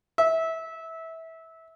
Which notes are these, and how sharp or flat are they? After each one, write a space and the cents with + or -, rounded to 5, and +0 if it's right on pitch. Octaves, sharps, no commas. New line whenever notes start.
E5 -20